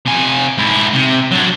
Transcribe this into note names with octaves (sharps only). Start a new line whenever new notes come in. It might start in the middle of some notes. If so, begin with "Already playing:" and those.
C3 G#5
G#2 E4
C3
F#3 D4